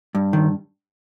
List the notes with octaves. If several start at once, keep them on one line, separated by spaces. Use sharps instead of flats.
G2
D#3